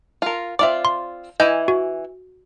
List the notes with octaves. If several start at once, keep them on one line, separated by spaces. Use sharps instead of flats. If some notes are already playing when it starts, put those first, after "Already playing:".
F4 A#4
C4 F4 D5 E5 D6
C6
E3 E4 D#5 G#5 G6
F#4